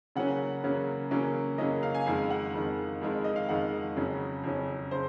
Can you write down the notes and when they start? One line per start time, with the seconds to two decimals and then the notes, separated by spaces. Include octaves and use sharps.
0.16 C#3 F#3 A#3 C#4 F#5
0.64 C#3 F#3 A#3 C#4
1.11 C#3 F#3 A#3 C#4
1.58 C#3 F#3 A#3 C#4 D#5
1.83 F5
1.94 G#5
2.06 F2 D#3 G#3 F5
2.30 F#5
2.54 F2 D#3 G#3
3.02 F2 D#3 G#3
3.24 D#5
3.36 F5
3.49 F2 D#3 G#3 F#5
3.97 F2 C#3 F#3 C#4
4.44 F2 C#3 F#3 C#4
4.91 C#3 C5